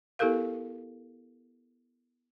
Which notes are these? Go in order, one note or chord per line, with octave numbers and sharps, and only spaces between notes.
B3 E4 G4 A4 A#4 F5